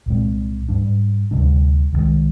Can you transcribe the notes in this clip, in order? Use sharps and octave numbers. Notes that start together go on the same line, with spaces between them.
C2 A#2 G#3 C4
G#2 G3 D4
D2 C3 G3 D4
C2 C3 D#3 G#3